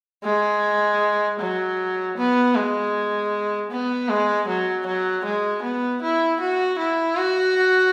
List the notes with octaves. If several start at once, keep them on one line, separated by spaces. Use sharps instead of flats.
G#3
F#3
B3
G#3
B3
G#3
F#3
F#3
G#3
B3
E4
F#4
E4
F#4